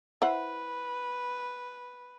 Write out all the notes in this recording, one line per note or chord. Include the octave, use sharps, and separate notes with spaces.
E4 B4 C5 F#5